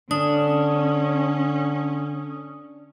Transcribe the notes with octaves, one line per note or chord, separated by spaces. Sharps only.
D3 C#4 D4 D#6